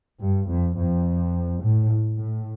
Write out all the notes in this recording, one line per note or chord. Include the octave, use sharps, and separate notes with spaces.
G2
F2
F2
A2
A2